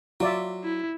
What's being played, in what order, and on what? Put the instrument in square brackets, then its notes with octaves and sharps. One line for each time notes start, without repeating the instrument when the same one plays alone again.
[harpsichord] F#3 [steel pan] F4 D5 E5
[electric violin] E4